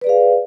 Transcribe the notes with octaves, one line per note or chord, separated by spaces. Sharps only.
G#4 B4 D5 F5